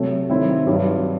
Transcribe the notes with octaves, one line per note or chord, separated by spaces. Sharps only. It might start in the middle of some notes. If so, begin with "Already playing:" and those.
Already playing: C3 F#3 A3
D#3 F#3 C4 E4
G2 F#3 C4